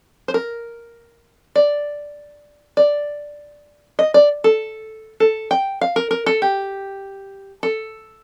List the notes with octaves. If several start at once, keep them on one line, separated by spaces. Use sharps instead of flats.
C5
A#4
D5
D5
D#5
D5
A4
A4
G5
F5
A#4
A#4
A4
G4
A4